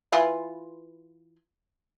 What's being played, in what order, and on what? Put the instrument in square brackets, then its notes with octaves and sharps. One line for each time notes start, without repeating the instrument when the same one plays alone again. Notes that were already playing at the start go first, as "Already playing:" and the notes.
[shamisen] E3 F4 B4